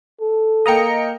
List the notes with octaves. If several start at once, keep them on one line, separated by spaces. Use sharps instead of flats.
A4
A#3 A#4 D#5 G5 A#5 C#7